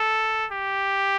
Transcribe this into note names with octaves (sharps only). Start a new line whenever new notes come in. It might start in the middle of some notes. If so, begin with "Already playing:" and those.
Already playing: A4
G4